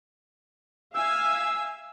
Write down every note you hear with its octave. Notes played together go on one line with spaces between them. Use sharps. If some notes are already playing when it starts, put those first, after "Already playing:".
E5 F5 G#5 E6